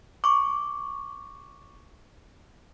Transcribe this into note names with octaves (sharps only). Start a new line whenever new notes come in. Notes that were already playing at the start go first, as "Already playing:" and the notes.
C#6 D6